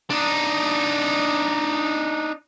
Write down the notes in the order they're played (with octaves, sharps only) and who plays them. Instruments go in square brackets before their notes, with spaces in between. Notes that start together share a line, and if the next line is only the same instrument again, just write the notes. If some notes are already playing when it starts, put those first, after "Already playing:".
[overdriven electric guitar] D4 D#4